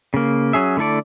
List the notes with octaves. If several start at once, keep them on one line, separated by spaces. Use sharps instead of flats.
C#3 A#3
F#3 C#4 G#4 E5
D3 A3 E4 A4 D5